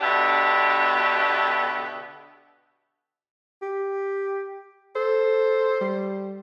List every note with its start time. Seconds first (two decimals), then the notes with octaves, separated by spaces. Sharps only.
0.01 B2 D3 B3 D4 G4 E5
3.62 G4
4.96 A4 C5
5.81 G3